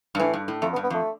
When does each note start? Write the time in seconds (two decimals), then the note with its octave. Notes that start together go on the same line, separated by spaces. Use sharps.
0.15 G2
0.19 A2 E3
0.33 G2
0.48 A2
0.62 F2 A3
0.73 B3
0.76 G2
0.83 B3
0.90 F2 A3